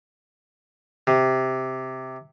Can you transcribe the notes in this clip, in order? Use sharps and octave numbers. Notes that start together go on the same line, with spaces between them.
C3